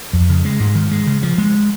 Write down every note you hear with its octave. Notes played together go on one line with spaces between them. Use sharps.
F2
C#3
G#3
G#2
D#3
G#3
C#3
F3
G#3